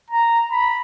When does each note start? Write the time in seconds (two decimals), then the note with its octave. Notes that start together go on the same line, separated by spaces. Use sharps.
0.10 A#5
0.51 B5